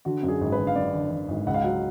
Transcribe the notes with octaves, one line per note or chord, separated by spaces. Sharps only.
D3 F#4
F#2
G#4
G#1
B4
D3
F5
F#2 D5
D3
D3
G#1
C#2 F#5
F5
F#3 F#5